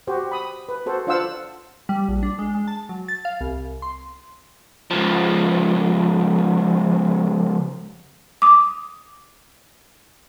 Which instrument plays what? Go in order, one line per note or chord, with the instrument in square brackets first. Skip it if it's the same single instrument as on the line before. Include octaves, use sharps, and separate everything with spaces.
[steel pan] F#4 G4 C5
B5 D#6
B4
F#4 A4 C5
D4 F4 C5 F5 F#5 E6
[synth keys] G3
A#1
D4
G#3
G#3
A5
F#3
A6
F5
C2
C6
[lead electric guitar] C#2 F3
[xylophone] D6 D#6